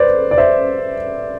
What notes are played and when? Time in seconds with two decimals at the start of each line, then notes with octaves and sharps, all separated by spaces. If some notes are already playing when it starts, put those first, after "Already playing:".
Already playing: B4 C5 D5
0.31 D5
0.38 C5 E5